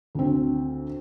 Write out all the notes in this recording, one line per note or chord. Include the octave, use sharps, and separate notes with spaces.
D2 C4